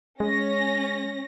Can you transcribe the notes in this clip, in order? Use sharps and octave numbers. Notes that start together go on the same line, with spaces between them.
G#3 C#4 A#6